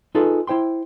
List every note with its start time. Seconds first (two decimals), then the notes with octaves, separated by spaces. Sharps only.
0.15 D#4 F4 G#4 A4 B4
0.47 E4 C5 G5 C6